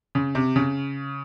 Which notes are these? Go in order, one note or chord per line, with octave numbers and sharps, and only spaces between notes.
C#3
C3
C#3